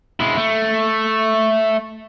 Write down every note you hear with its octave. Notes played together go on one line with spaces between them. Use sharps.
G#3 E4
A3